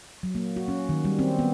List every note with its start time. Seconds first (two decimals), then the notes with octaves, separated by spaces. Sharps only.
0.23 F#3
0.35 A#3
0.56 F#4
0.68 C#4
0.89 D#3
1.05 G3
1.19 C4
1.39 B3